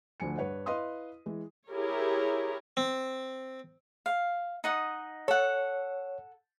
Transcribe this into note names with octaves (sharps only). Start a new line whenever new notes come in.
D2 D3 F3 G#5 C#7
G2 B4 C#5 F#5
E4 B4 D#5 F5 C6 D#6
E3 G#3
E4 G4 G#4 A#4 C#5
C4
F5
D#4 F#5 D#6
A4 C#5 F#5